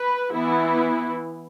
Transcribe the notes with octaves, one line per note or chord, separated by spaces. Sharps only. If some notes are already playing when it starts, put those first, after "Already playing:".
Already playing: B4
E3 B3 E4